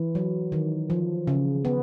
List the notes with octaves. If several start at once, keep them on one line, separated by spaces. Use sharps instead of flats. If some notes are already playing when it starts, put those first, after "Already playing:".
Already playing: E3
F#3
D#3
F3
C#3
B3